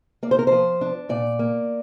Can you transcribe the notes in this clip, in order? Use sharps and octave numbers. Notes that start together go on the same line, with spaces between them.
A#3 D5
C5
A#4
F3 C5
D4
A#2 D5
A#3